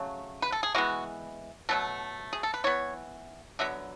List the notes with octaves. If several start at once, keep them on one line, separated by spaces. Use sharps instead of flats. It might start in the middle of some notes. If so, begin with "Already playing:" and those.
Already playing: C#3 F#3 A3
B4
A4
G#4
E3 G#3 B3 F#4
B2 F#3 A3 A4
G#4
A4
B4
E3 B3 C#5
D3 F#3 B3 E5